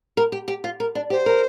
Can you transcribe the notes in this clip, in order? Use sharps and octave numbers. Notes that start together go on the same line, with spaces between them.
A#4
G4
G4
F4
A#4
D4
G4 C5
A#4